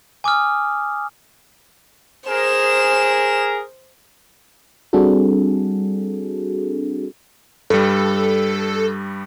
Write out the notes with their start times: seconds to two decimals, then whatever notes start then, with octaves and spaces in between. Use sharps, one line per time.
0.24 G#5 D6 D#6 F6
2.29 G#4 A#4 C5 E7
4.93 G3 C4 D4 F#4 G#4 A4
7.70 G2 G3 A4